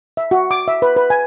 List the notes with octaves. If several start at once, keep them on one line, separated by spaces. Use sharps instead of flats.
E5
F#4
D6
E5
B4
B4
G#5